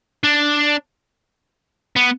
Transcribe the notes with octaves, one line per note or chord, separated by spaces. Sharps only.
D4
B3